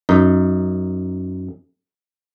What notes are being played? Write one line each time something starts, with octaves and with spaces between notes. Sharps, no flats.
F#2 D#4